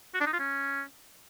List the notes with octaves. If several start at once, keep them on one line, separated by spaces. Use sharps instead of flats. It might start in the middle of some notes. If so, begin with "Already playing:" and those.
F#4
D4
D#4
F4
C#4